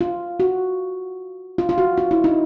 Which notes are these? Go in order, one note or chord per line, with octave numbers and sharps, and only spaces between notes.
F4
F#4
F4
F4
F#4
F4
E4
D#4